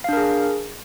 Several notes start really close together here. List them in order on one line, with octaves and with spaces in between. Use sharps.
F5 D4 A#4 G#4